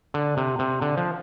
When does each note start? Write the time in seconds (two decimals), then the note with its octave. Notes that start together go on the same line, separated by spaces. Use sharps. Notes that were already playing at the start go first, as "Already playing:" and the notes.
0.14 D3
0.37 C3
0.59 C3
0.82 D3
0.97 F3